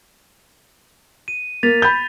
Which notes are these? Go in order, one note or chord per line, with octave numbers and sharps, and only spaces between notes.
D#7
A#3 A6 B6 F7
B5 G6